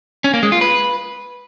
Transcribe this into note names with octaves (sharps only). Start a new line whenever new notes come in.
C#4
A#3
G#3
F4
B4